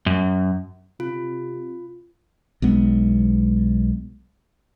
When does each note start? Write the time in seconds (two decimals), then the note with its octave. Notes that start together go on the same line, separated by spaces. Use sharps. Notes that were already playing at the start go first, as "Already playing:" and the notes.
0.06 F#2
1.00 C3 F4
2.62 B1 G#3 B3